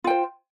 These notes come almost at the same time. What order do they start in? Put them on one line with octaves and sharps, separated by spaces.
F4 G5 C5